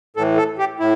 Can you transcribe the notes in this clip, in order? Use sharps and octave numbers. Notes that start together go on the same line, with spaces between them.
A2 E3 A4
A4
G4
A2 E4